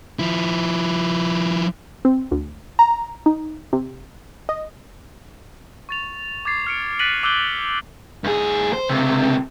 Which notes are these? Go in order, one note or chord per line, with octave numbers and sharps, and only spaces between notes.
F3 E4
C4
D2
A#5
D#4
C3
D#5
C#6 A6 F7
D6 G#6 A6 C7
F6 C#7 D7
F#6 A6 B6 D7 D#7 F#7
D6 E6 F#6 G6 G7
G2 G#4
C5
C#2 C3